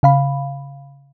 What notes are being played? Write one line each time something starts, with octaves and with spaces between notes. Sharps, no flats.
C#3 F5 B5